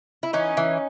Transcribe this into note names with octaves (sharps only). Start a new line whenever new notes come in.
E4
E3 C#4 D#4
E3